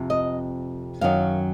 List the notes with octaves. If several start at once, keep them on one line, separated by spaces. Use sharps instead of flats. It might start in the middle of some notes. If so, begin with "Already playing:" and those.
Already playing: F2 C3
D#5
F#2 D#3 F#3 F5